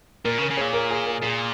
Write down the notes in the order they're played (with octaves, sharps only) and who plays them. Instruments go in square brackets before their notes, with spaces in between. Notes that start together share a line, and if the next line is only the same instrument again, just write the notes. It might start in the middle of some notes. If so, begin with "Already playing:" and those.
[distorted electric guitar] A#2 [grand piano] A#4
[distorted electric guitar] C#3
[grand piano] A#4
[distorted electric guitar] C#3
[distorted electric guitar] A#2 [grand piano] G#4 C#5
[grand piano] A#4
G#4
A#4
[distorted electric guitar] A#2 [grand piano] G#4